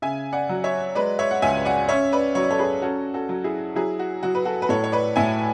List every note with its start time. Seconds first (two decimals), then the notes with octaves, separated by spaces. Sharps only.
0.02 C#3 E5 G#5
0.33 D5 F#5
0.49 F#3
0.64 C#5 E5
0.95 G#3 B4 D5
1.19 C#5 E5
1.31 F#5
1.42 C#2 E5 G#5
1.65 D5 F#5
1.89 C#4 C#5 E5
2.13 B4 D5
2.35 F#3 C#5
2.43 D5
2.50 A4 C#5
2.59 G#4 B4
2.82 C#4 F#4 A4
3.14 F#4 A4
3.29 F#3
3.44 E4 G#4
3.75 F#3 E4 G#4
3.99 F#4
4.23 F#3 F#4
4.35 B4
4.45 F#4 A4
4.62 B4
4.69 A2 A4 C#5
4.84 C#5
4.92 B4 D5
5.16 A2 E5 G#5